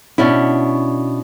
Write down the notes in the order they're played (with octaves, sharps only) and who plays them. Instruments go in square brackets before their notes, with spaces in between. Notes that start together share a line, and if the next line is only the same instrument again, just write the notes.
[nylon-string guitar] B2 C#4 D4 E4